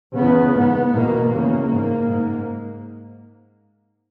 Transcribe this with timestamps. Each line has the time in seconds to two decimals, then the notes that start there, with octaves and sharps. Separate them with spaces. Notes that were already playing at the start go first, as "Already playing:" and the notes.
0.16 E2 C#3 B3
0.55 G#2 B3
0.93 E2 B2 A#3
1.32 E2 C#3 A#3
1.71 G#2
2.09 G#2